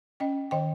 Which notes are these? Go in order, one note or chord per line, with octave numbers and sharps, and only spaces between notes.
C#4 D#5 G5
D#3 D#5 G5